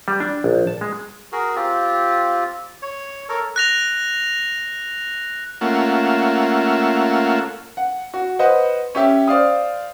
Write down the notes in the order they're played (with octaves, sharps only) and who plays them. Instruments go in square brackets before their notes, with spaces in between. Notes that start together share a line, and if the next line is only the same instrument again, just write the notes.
[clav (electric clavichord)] G3
D4
A#1
A5
G#3
[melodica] F#4 G#4 A#4
C4 F4 G4
C#5
A4 A#4 C#5
[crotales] F#6 A#6 F7
[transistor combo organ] A3 A#3 C#4 F4 E5 F#5
[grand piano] F#5
F#4
B4 C5 D#5 F#5
C#4 G4 E5
C5 D5 F5 D#6